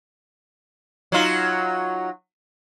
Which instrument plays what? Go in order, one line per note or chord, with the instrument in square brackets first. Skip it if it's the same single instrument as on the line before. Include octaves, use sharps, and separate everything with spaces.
[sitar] F#3 D#4 F4